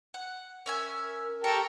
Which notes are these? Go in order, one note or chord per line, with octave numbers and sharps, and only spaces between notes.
F#5
C#4 A#4 E5 G#5
G4 A4 A#4 C#5 G5